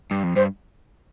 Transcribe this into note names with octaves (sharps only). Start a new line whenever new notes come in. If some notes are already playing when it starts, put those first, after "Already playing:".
G2
F2
G2 C5